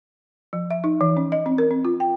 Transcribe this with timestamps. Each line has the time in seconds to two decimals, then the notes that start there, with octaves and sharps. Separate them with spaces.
0.53 F3
0.71 E5
0.84 D#4
1.01 E3
1.17 C#4
1.32 D#5
1.46 C4
1.58 A#4
1.71 C4
1.85 F4
2.00 G5